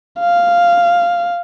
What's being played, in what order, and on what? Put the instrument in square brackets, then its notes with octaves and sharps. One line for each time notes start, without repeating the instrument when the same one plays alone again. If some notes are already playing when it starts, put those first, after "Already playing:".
[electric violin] F5